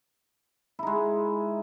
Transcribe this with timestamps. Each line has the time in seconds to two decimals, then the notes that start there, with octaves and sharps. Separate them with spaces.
0.79 E4
0.83 D#4
0.87 G#3